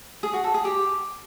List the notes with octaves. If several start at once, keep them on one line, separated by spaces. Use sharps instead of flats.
G#4
F#4
A4
G#4
G4